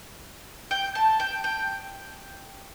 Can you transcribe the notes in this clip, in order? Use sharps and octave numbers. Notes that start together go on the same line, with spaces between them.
G5
A5
G5
G5